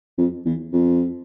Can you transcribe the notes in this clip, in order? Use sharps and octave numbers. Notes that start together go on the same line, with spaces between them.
F2
E2
F2